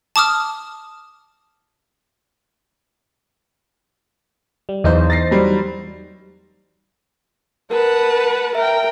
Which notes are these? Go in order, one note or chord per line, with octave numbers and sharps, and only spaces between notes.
A5 D6 D#6 F6
G3
B1 E2 D#4 C5
A6 A#6 C7
F#3 G3
A#4 B4 F#5 A5
A#4 E5 G5